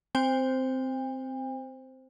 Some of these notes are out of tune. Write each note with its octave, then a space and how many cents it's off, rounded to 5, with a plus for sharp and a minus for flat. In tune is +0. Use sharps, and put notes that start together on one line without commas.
C4 -10 C5 +0 G5 +45